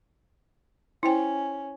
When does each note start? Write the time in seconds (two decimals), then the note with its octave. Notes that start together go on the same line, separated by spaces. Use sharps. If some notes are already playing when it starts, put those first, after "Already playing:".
1.03 C#4 E4 C5 G5